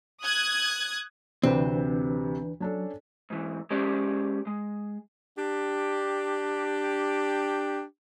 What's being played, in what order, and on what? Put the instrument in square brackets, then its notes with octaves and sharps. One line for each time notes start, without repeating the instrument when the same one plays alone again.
[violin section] D#6 F#6 G#6
[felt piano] D2 C3 [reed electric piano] E3 D4 B4 [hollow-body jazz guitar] C4
[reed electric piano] F#3 [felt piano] C#4 D4 A4
[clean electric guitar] G#2 E3
G#3 C#4 G4 C5 D5
G#3
[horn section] D4 G4